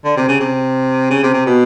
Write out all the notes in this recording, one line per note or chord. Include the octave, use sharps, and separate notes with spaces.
D3
C3
C#3
C3
C#3
C3
C3
B2